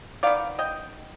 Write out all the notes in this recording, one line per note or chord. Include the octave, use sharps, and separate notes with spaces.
D#3 B3 D5 F5
D#5 G5